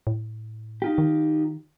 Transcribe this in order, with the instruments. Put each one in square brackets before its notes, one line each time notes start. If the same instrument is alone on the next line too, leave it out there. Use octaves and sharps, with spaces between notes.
[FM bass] A2
[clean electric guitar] D#4 F4 G4
[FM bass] D#3